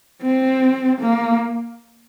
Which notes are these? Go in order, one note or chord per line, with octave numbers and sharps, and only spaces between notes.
C4
A#3